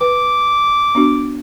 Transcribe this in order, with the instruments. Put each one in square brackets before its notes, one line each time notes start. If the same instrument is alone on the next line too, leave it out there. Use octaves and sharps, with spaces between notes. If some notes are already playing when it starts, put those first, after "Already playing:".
[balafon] B4 [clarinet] D6
[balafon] B3 D4 F#4